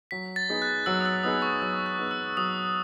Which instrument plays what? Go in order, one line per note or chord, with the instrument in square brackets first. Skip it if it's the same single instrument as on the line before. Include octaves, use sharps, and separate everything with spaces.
[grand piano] F#3 [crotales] B6
[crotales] A6
[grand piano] B3 D#4 G#4
[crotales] F#6
[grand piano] F#3 [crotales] E6
[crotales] D#6
E6
[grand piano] B3 D#4 G#4 [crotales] D#6
[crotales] C#6
[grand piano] F#3 [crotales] D#6
[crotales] F#6
[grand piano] B3 D#4 G#4
[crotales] E6
[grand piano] F#3 [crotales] D#6